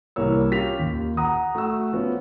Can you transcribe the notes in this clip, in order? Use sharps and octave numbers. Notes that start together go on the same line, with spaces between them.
C2 E3 A#3 C#5 E6
C#4 F4 G4 B6 F7
D#2
F#5 A#5 D#6
A3 F#4 F#5 E6
F3 B3 C#4